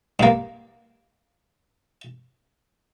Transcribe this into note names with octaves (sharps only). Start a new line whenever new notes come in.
G2 A#3